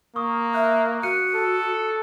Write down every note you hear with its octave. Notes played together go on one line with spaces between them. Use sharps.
A#3 C#6 D#6
E5 F#6
F#4 F#6 C#7 D#7
A4